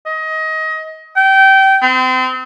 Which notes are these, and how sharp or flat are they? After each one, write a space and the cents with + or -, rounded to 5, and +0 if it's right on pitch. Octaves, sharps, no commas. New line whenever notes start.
D#5 +25
G5 -25
C4 -35